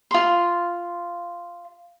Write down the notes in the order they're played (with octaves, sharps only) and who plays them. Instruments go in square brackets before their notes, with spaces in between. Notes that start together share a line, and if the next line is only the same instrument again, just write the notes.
[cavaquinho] F4 C6